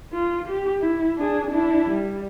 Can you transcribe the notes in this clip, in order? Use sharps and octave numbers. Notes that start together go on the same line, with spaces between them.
F4
G4
E4
D4 G#4
D4 E4
G3